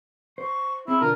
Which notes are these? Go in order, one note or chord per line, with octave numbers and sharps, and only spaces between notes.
C5 C#6
C4 E4 G#4
B2 D3 D4 F4 A#4